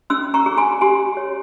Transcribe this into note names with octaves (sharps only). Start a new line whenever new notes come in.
C#4 C6 E6
A#5 C#6
G#4
G#5 C6
G4 G#5 C6
C#5